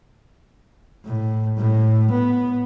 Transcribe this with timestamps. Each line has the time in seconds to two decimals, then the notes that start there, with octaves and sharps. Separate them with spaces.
1.05 A2
1.58 A2
2.11 B3